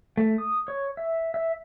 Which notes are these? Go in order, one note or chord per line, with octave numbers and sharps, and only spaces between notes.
A3
D#6
C#5
E5
E5